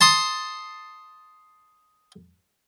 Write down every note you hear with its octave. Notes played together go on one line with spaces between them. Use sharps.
A5 C6 D#6